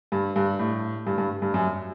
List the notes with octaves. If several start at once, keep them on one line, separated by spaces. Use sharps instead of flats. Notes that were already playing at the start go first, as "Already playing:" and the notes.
G2
G2
A2
G2
G2
G2
F#2